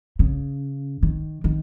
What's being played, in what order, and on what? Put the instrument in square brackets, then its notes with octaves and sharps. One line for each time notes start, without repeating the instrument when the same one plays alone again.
[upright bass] C#3
D#3
D#3